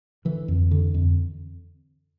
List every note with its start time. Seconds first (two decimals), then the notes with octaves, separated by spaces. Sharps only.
0.25 D3 E3
0.48 F2
0.71 D3
0.94 F2